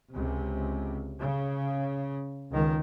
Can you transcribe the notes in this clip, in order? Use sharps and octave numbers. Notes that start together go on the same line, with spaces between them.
C#2 C3
C#3
C#2 D#3